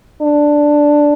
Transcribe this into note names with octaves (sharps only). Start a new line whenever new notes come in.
D4